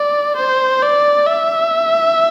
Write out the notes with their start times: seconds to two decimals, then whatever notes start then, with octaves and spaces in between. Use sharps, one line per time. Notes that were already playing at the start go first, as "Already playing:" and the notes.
Already playing: D5
0.37 C5
0.82 D5
1.27 E5